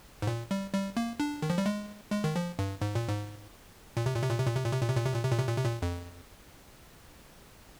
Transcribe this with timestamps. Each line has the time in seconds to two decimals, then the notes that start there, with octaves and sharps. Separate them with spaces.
0.22 G#2
0.27 A#2
0.51 G3
0.74 G3
0.97 A#3
1.20 D4
1.42 D#3
1.50 F3
1.58 G3
1.66 G#3
2.12 G#3
2.24 D#3
2.36 F3
2.59 G2
2.81 G#2
2.95 A#2
3.09 G#2
3.97 A#2
4.06 C3
4.15 A#2
4.23 C3
4.30 A#2
4.39 C3
4.47 A#2
4.55 C3
4.64 A#2
4.72 C3
4.81 A#2
4.89 C3
4.97 A#2
5.05 C3
5.14 A#2
5.23 C3
5.31 A#2
5.39 C3
5.48 A#2
5.56 C3
5.65 A#2
5.82 F2